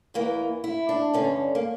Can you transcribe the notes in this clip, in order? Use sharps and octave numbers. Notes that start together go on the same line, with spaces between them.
E2 E3 A#3
E4
D4
G2 D3 C#4
A#3